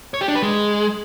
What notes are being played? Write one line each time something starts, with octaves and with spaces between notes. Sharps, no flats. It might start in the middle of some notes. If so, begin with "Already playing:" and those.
C#5
G4
D4
B4
G#3